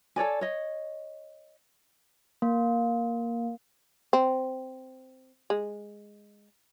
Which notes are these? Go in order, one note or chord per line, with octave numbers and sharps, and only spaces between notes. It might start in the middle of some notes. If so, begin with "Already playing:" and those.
A4 C#5 D5 G#5
C#5 D#5
A#3
C4
G#3